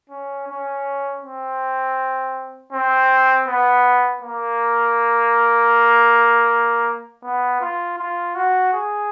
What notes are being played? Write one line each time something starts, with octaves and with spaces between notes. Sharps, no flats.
C#4
C#4
C4
C4
B3
A#3
B3
F4
F4
F#4
G#4